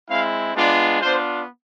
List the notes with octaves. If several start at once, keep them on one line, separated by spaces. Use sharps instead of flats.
G#3 C4 E4 F5
G#3 B3 D4 F4 D5
B3 D4 F4 C5